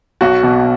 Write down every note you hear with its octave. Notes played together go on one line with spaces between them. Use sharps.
B1 F#4
B2